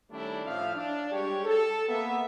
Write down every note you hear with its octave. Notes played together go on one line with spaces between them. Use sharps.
D#3 G3 A3 C#4 D4 E4
A2 F3 E5 F5
D4
G3 G#3 G4 G#4 C#5
A4
A#3 B3 E5